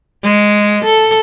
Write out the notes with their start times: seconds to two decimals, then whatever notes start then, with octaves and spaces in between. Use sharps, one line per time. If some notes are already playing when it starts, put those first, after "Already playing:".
0.24 G#3
0.85 A4